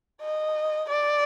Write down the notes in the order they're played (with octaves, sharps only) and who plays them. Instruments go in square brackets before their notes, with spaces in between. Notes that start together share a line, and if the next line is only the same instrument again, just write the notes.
[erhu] D#5
D5